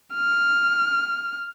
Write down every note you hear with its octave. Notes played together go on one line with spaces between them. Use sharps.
F6